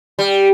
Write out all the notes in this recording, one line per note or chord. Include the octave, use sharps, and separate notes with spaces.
G3